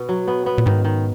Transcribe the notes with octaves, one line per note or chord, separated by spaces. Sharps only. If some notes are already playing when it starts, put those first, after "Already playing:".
Already playing: B2 B3
F#3
B3
B3
A#2
G#2 D#3
D#3